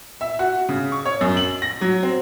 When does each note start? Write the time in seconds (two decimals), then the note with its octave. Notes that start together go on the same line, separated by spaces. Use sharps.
0.21 E5
0.39 F#4
0.69 C#3
0.92 C#6
1.05 C#5
1.21 F#2
1.37 F#7
1.62 A#6
1.81 F#3
2.03 C4